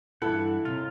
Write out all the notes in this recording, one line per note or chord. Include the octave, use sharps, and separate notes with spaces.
G2 E3 E4 A4 F#5
D#2 C3 F4